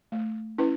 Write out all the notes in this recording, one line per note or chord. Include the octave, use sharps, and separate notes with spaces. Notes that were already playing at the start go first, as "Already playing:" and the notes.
A3
C#4 E4 B4